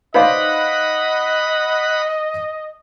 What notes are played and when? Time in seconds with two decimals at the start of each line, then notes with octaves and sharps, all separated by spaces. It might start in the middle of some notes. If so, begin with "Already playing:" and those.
0.14 D#4 B4 C5 D5 D#5 F5 F#5 B5